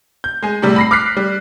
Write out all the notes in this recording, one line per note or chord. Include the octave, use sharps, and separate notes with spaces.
G6
G#3 G#4
A2 C3 G3
B5 A#6 C7
D6 F6 F#6 B6 C7
G3